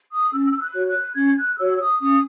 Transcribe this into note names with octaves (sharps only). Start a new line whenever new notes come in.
D#6
C#4 E6
E6
F#6
F#4 C#5
F#6
C#4 G#6
F#6
F#6
F#4 C#5 E6
D#6
C#4 D#6